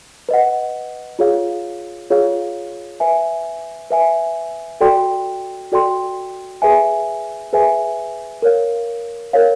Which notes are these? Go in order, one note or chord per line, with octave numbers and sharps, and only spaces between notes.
B4 D#5 F#5
F4 G#4 C#5 F5
F4 G#4 C#5 F5
B4 E5 G#5
B4 E5 G#5
F#4 A4 D5 G5 C6
F#4 A4 D5 G5 C6
G#4 B4 E5 G#5
G#4 B4 E5 G#5
A#4 C#5 F5
A#4 C#5 F5